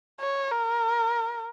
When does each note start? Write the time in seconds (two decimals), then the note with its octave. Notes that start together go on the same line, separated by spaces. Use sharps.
0.20 C#5
0.51 A#4